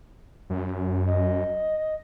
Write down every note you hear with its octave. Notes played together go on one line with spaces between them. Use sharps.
F#2
D#5